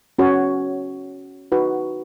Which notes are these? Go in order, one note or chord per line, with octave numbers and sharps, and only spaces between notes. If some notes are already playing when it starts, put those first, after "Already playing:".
C#4 F#4 C#5
D#4 F#4 B4